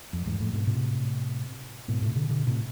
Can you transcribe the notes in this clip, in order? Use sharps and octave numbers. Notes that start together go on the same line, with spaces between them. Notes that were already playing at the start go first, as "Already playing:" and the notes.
F2
E2 G#2
F2 A2
G#2 B2
A2 C3
G#2 B2
A2 C3
B2 D3
B2 D3
A2 C3